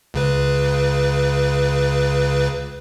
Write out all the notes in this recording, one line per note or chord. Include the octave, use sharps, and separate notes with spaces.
C#2 C#3 B4